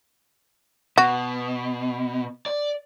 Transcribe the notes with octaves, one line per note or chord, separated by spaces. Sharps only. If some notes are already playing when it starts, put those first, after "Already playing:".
B2 F#4
D5